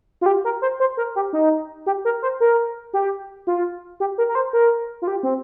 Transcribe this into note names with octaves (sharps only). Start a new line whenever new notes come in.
F4
G4
A#4
C5
C5
A#4
G4
D#4
G4
A#4
C5
A#4
G4
F4
G4
A#4
A#4
C5
A#4
F4
G4
C4